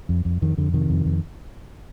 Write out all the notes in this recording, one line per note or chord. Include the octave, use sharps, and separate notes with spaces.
F2
F2
F2 D#3
F2 D3
C3 D#3
F2
F2